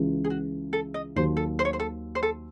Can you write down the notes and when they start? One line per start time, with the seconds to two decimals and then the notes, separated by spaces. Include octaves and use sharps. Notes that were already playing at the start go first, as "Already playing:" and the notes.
Already playing: C#2 C#3 E3
0.24 G#4
0.30 F#4
0.73 A4
0.94 D#5
1.16 D#2 D#3 F#3 C5
1.37 A4
1.59 C5
1.65 C#5
1.73 C5
1.80 A4
2.15 C5
2.23 A4